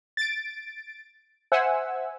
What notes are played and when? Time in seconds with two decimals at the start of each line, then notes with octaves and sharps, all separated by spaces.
0.17 A6 D7
1.52 C5 E5 F#5 G#5 E6